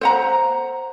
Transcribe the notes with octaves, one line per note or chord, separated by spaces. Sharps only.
C5 F#5 A#5